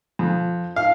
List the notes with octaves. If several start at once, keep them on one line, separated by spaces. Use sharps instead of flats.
F2
F5